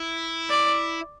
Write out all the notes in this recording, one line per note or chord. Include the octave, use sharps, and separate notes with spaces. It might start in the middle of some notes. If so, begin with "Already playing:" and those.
Already playing: E4
D5